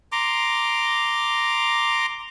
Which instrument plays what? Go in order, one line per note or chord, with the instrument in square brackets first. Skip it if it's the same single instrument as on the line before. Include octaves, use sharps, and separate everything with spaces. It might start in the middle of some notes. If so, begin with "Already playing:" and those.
[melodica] A#5 C6 D6